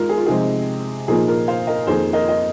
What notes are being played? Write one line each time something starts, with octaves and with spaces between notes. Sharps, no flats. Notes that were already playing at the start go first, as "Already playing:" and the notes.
Already playing: D#3 G#3 F4 A#4
G#4
F4
C3 F3 G#3 C4 D#4 G#4
A#2 F3 A#3 D#4 G#4
F4 A#4
C5 F5
A#4 D#5
F2 D#3 A#3 G#4 C5
A#4 D#5
D#5